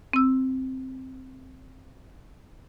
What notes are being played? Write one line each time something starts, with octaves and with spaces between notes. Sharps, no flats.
C4 E6